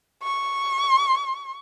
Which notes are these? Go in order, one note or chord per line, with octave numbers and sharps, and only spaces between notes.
C#6